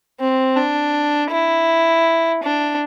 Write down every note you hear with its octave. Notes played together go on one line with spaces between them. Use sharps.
C4
D4
E4
D4